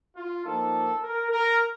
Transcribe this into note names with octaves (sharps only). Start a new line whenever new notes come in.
F4
F3 A#3 D#4 A4
A#4
A#4